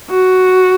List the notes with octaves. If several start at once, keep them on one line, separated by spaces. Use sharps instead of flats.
F#4